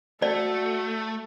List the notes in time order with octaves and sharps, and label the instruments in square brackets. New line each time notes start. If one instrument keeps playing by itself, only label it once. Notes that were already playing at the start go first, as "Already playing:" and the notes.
[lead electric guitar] A3 [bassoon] F#4 [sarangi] A4 [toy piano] D5